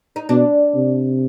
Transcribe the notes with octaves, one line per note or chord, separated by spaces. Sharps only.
D#4
B2 D4
C3